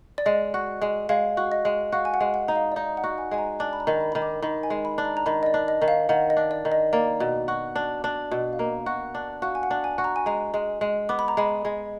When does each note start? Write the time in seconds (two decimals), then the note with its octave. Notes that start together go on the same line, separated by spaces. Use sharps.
0.18 D5
0.26 G#3 D#5
0.54 F#4
0.81 G#3
1.09 G#3 F5
1.37 F#4
1.52 D#5
1.65 G#3
1.92 F#4 F5
2.05 G#5
2.14 F#5
2.20 G#3
2.34 F#5
2.48 D#4
2.56 F5
2.72 D5
2.76 D#4 D#5
2.97 F#5
3.04 F#4
3.18 G#5
3.31 G#3 G#5
3.38 A#5
3.59 D4 G#5
3.73 B5
3.80 A#5
3.87 D#3
4.01 B5
4.12 D#3 B5
4.22 D6
4.42 D#3 B5
4.63 G#5
4.70 G#3
4.85 B5
4.98 D4
5.05 A#5
5.17 A#5
5.26 D#3 B5
5.43 D#5
5.46 D5
5.54 D4
5.68 D#5
5.82 D#3
5.88 F5
6.09 D#3 F#5
6.30 D#5
6.37 D4
6.51 D5
6.65 D#3
6.72 D#5
6.93 A#3 D5
7.20 B2
7.48 F#4
7.76 D4
8.04 D4
8.31 B2
8.53 F5
8.59 A#3 D#5
8.86 F#4
9.15 D4
9.42 F#4 F5
9.55 G#5
9.63 F#5
9.71 D4
9.84 G#5
9.98 F#4
10.04 A#5
10.16 G#5
10.26 G#3 A#5
10.54 G#3
10.81 G#3
11.09 B3 D6
11.19 B5
11.28 A#5
11.37 G#3 B5
11.65 G#3